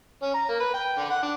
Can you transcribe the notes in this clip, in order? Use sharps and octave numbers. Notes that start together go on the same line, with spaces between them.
C#4
A#5
A#3
B4
G5
D3
F#5
D4